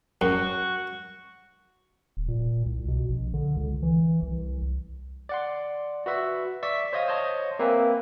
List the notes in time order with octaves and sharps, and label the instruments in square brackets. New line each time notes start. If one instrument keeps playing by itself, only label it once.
[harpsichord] F#2 [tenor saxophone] F#4
[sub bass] D1
A#2
C2
B2
A#1
D3
C#2
E3
C2
[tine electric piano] D5 F#5 C6
F#4 B4 E5
D5 E5 C#6 E6 B6
C5 C#5 D#5 F5 D#6
C5 C#5 D#5 A5
A#3 C4 B4 E5 G#5